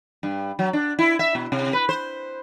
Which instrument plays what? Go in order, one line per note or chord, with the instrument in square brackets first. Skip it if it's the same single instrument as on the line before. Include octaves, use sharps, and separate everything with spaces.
[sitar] G2
F#3
D4
E4
E5
B2
C3
B4
C5